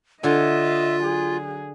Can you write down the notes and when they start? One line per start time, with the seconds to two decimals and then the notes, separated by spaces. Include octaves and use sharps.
0.23 D3 F4 D#5 E5 G#5
1.03 F#3 G#4